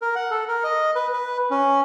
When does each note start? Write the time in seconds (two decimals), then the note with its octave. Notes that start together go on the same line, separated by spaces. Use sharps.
0.02 A#4
0.15 F#5
0.31 A4
0.48 A#4
0.64 D#5
0.95 B4
1.13 B4
1.51 C#4